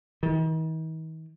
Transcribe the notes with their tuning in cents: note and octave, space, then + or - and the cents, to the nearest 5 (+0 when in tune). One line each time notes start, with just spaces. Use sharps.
D#3 +45